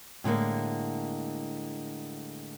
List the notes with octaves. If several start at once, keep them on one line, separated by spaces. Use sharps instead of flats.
A2 D3 G#3 A#3